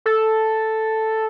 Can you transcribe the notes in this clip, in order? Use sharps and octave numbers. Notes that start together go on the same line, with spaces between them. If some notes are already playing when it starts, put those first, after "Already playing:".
A4